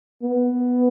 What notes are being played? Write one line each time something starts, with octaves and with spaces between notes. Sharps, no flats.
B3